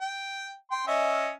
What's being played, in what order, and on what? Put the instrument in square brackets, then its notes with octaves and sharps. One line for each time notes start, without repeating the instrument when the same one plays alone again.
[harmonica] G5
G5 C6
C#4 D#5 E5